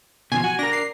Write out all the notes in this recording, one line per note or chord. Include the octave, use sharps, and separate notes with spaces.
B2 D#3 F3 G#5
F#4
D4 A#4 A#6
C7